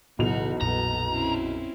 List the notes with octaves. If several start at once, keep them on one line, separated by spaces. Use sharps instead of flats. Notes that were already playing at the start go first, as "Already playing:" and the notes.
B1 E2 A2 C#3 E3 F#4 F7
A#1 F2 A#2 B3 A#5
C4 C#4 E4